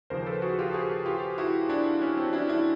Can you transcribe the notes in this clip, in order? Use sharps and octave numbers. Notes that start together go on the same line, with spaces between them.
D#2 C#3 F3 A#4 C5
A4 B4
F#4 G#4
F4 G4
F#4 G#4
F4 G4
E4 F#4
D4 E4
C#4
C4
D4 E4
D4 E4